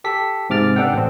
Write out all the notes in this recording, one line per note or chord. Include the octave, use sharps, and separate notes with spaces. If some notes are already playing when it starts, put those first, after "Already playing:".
G4 A4 B6
G#2 C3 D6 F6 A6
B3 D4 A4 F#5 G5
A1 C4